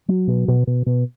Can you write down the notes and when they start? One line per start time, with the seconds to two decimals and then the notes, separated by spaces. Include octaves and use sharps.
0.08 F#3
0.27 B2
0.48 B2
0.67 B2
0.86 B2